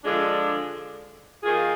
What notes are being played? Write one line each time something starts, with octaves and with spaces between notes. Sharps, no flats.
D3 F3 G#3 D4 F4
D#3 A#3 F4 G#4